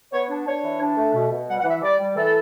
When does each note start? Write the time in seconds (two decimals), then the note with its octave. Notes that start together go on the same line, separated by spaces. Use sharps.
0.12 B3 C#5
0.29 D4
0.46 D4 C#5
0.63 E3
0.80 D4
0.96 A3
1.14 B2
1.31 B2
1.48 G3 F#5
1.60 F#5
1.65 E3
1.70 E5
1.82 G3 D5
1.99 G3
2.16 E3 A4